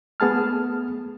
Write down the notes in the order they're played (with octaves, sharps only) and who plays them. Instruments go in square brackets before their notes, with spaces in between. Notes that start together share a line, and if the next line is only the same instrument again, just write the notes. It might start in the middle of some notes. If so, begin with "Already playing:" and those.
[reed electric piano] A3 B3 G#4 A5 F6